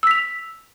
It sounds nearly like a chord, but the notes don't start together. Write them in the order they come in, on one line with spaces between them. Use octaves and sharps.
E6 B6 F7